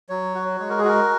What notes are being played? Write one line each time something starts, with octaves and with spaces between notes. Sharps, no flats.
F#3 C#5
F#4
G#3 C#5
A#4
G#4
F#4 A#4